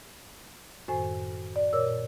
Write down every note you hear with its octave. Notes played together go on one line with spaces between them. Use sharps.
F#2 A2 D#3 C5 G#5
D5
A#2 A#4 C#5 E6